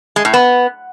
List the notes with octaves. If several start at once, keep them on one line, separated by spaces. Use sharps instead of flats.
G#3
A2
B3